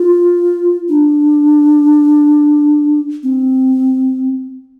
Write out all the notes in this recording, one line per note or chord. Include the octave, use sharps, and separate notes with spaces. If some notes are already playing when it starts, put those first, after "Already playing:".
Already playing: F4
D4
C4